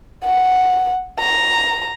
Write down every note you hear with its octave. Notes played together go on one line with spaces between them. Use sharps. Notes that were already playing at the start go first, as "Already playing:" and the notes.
F#5
A#5